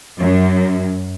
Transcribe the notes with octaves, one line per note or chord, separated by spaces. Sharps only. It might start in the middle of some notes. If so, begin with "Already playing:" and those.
F#2